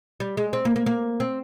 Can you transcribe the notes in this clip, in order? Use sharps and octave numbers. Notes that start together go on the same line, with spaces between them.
G3
G#3
C4
A#3
A#3
A#3
C4